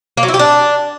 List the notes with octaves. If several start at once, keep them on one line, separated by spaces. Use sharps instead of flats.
A#3
F#3
E4
G4
D4